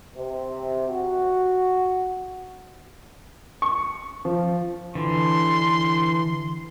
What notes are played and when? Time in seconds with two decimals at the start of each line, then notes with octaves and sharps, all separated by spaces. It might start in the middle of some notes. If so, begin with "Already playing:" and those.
0.16 C3
0.88 F#4
3.62 C#6
4.25 F3
4.95 D3 E3 C6